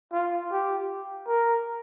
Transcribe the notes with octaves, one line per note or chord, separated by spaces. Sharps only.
F4
G4
A#4